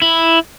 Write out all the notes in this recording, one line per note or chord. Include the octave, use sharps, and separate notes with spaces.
E4